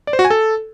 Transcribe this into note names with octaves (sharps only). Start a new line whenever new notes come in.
D5
C5
F#4
G#5
A4